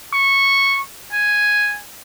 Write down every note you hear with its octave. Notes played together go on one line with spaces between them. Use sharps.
C#6
G#5